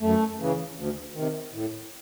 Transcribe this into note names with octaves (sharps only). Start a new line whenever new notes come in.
F#2 A3
C#3 E3
D2
C3 D#3
A2